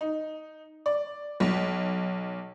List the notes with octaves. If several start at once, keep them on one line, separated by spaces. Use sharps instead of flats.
D#4
D5
B1